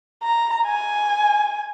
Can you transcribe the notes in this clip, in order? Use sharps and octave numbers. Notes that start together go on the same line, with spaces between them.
A#5
G#5